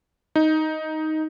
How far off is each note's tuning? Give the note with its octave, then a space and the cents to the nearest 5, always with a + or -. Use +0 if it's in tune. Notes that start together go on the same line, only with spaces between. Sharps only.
D#4 +10